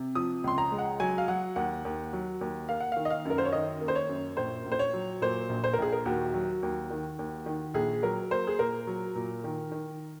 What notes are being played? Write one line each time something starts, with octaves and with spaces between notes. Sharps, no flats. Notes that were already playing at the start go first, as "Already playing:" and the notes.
Already playing: C3
F3 D#6
C#2 C6
A#5
G#3
F#5
F#3 G#5
F5
F#3 F#5
D#2 F#5
D#2
F#3
D#2
A#3 F5
F#5
D#3 F5
D#5
F5
F#2 A#4
C5
C#5
D#3 D#5
A#3
C5
C#5
F#2
A#1 C5
A#1
C5
C#5
F#3
A#2 C5
A#1
C5
A#4
A#1 G#4
A#4
D#2 F#4
F#3
D#2
D#3
D#2
D#3
A#1 G#4
F#3 A#4
A#3 C5
G#4
A#2 A#4
F#3
A#2
D#3
D#3